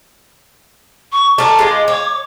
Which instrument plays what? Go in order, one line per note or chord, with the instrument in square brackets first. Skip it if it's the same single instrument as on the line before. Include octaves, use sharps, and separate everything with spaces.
[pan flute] C#6
[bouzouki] A3 A#4 [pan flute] D6
[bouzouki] G#3 F4
C#5